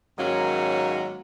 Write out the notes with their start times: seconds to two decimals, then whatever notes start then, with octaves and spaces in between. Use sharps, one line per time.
0.19 G#2 D#3 F#3 A#3 C#4